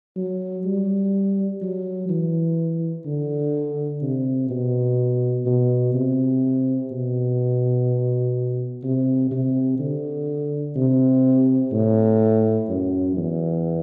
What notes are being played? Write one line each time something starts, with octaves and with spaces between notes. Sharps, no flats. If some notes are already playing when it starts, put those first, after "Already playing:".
F#3
G3
F#3
E3
D3
C3
B2
B2
C3
B2
C3
C3
D3
C3
A2
F#2
E2